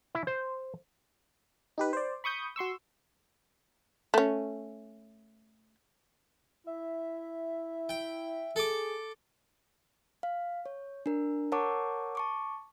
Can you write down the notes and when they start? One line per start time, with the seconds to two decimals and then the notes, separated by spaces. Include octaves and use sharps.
0.15 E4
0.27 C5
1.78 D#4 G4 B4
1.93 C5 D5
2.24 B5 C#6 D#6 G6
2.56 F#4 C6 C#6 E6
4.14 A3 C#4
6.67 E4 E5
7.89 G5
8.56 G#4 A4 D6
10.23 F5
10.66 C#5
11.06 D4 A#4
11.52 A#4 C#5 F#5 A5 C#6 D6
12.15 A5 C#6 D6